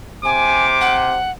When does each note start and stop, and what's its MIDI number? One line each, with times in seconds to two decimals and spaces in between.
0.25 1.20 48
0.25 0.65 80
0.25 0.98 86
0.81 1.31 78